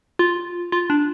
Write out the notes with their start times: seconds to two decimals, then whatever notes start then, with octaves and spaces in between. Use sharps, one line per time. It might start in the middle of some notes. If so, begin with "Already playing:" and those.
0.19 F4
0.72 F4
0.90 D4